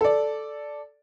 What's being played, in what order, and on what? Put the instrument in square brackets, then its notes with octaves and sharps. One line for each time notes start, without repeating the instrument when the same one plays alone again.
[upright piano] A4 D5